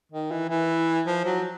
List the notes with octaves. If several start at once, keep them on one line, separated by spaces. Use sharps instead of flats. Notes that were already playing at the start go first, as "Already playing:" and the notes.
D#3
E3
E3
F3
F#3